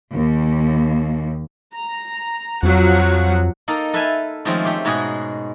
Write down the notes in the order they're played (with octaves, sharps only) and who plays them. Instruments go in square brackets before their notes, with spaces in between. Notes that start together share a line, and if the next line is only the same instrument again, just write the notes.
[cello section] D#2
[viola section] A#5
[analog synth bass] F2 [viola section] F3 F#3 F#5
[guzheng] A#3 D#4 A4 A#4
A4 B4 E5 F5 G#5 A5
D#3 F3 G#3 A3 C4 C#4
A3 G4
G#2 B2 G#3 F#4 G#4